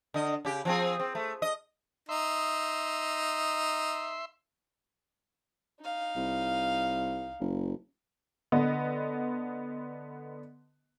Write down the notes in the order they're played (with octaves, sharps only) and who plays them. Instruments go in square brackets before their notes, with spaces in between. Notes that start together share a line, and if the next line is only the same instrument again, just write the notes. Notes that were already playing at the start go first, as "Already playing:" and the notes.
[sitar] D3 D#5
C#3 G4
F3 C4 G#4
C4
A3
D#5
[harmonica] D#4 [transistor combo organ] E5 C6
[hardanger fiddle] D#4 F5
[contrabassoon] C2
F#1
[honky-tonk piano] D3 B3 D#5